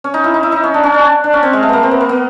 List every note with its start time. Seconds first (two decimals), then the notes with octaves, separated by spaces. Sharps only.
0.04 C#4
0.14 D#4
0.24 E4
0.34 D#4
0.43 E4
0.52 D#4
0.63 C#4
0.74 D4
0.83 C#4
0.94 D4
1.24 D4
1.33 C#4
1.43 C4
1.53 G#3
1.63 A3
1.69 A#3 B3
1.83 C4
1.91 B3
2.01 A#3
2.09 B3